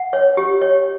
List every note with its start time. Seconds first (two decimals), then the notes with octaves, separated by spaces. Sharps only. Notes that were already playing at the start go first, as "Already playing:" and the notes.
Already playing: F#5
0.13 C#5
0.37 G4
0.62 C#5